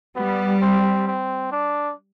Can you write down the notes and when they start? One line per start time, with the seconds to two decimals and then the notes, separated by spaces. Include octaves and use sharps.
0.16 G3 B3
0.62 C4
1.07 C4
1.52 D4